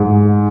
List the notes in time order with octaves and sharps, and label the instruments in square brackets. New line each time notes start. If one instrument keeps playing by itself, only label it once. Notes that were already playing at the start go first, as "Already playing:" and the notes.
Already playing: [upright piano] G#2